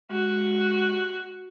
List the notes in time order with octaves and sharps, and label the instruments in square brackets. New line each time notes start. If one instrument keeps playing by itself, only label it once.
[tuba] G#3 [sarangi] F#4